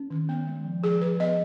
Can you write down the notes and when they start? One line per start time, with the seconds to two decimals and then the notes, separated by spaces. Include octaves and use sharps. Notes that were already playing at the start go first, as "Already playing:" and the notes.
Already playing: C#4
0.10 D#3
0.29 B3
0.47 G#3
0.64 F3
0.83 F3 G#4
1.01 F3 B4
1.20 B3 D#5